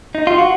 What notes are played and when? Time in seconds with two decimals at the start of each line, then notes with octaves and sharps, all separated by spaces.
0.15 D#4
0.27 F4
0.38 F#4